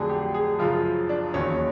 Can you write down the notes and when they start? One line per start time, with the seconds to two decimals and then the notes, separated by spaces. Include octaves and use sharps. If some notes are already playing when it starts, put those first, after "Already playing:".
Already playing: F2 D3 F#3 A3 G#4
0.09 G4
0.34 G#4
0.59 F#2 C#3 F3 F4
1.09 D4
1.34 E1 D#2 D#3 F#3 C#4